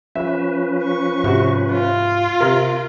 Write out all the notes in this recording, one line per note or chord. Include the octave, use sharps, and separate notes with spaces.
F3 C#4 B4 E5
C#6
G#2 C3 F#4
F4
C3 A#4